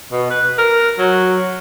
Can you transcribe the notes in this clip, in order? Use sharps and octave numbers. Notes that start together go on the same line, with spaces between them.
B2
B4
A#4
F#3